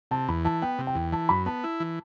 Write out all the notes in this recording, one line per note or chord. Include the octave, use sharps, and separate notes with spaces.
C3 A5
E2 B5
E3 A5
B3 G5
C3
G5
E2
E3 A5
F#2 B5
B3 A5
E4
E3